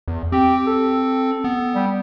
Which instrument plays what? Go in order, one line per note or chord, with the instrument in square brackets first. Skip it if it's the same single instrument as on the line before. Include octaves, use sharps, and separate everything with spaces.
[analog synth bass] E2
[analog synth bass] C4 [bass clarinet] G4
[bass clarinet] A4
[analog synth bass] B3
[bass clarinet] G3